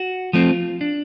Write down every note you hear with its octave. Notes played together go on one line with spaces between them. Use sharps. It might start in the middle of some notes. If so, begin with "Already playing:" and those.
Already playing: F#4
F3 A3 C4 F4
D4